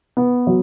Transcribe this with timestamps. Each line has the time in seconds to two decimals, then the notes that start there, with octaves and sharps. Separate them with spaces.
0.17 B3
0.47 F#3